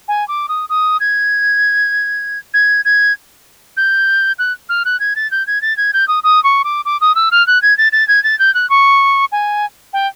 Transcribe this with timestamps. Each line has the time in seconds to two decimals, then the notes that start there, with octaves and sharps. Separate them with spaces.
0.08 G#5
0.28 D6
0.49 D#6
0.69 D#6
1.00 G#6
2.54 G#6
2.85 G#6
3.77 G6
4.39 F#6
4.69 F6
4.85 F#6
5.00 G#6
5.16 A6
5.31 G6
5.47 G#6
5.62 A6
5.77 G#6
5.93 G6
6.08 D#6
6.23 D#6
6.44 C#6
6.64 D6
6.85 D6
7.01 D#6
7.15 E6
7.31 F6
7.47 F#6
7.62 G#6
7.78 A6
7.92 A6
8.08 G#6
8.24 A6
8.39 G6
8.55 F#6
8.70 C#6
9.32 G#5
9.93 G5